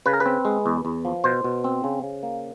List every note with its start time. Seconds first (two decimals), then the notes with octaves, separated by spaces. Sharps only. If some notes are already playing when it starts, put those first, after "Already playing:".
0.06 C#3 B4
0.14 A#4
0.20 B4
0.26 C4
0.45 G#3
0.66 E2
0.85 E2
1.05 F3
1.24 B2 C5
1.44 B2
1.64 C4
1.84 C#3
2.03 C#3
2.23 A#3